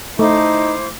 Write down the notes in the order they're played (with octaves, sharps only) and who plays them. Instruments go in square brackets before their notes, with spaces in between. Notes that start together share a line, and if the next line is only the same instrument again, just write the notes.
[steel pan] A3 [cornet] D#4 [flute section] E4 C5 D6